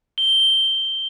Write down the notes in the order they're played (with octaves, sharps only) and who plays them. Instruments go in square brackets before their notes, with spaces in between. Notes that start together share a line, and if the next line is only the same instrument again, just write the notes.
[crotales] G7